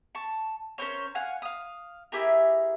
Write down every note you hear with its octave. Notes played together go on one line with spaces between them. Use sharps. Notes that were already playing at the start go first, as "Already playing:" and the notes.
A5 C#6
C#4 A#4 C5 C#5
F5 F#5 G#5
F5 D#6
E4 G4 G#4 A#4